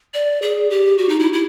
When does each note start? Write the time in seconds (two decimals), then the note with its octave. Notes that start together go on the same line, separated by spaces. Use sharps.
0.14 D5
0.42 G#4
0.70 G4
0.98 F#4
1.09 D#4
1.19 E4
1.33 E4